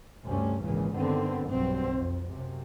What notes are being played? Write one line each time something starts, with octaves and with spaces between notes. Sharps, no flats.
D2 G2 C3 A3 C#4
G#1 C#2 A#2 C#3 E3
G2 D3 D#3 B3 C4
B1 G2 B2 F#3 C4
F2
F#2 C3